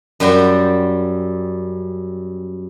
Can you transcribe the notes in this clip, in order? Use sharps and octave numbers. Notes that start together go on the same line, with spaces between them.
F#2 G3 F#4 G5